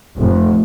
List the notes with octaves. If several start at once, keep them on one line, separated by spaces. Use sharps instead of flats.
F1